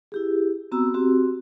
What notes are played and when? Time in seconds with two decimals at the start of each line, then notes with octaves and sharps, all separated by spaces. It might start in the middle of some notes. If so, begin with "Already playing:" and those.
0.12 E4 G4 G#4
0.72 B3 C4 F#4 A#5 E6
0.94 C4 F#4 G4